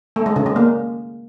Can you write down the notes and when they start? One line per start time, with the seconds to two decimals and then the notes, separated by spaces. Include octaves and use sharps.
0.16 A3
0.26 G#3
0.36 C#3
0.46 G#3
0.56 A#3